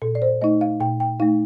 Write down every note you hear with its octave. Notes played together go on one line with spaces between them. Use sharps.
A#2 A4
D5
C5
A3 D#4 D#5
F5
A#2 G5
G5
A3 D#4 F5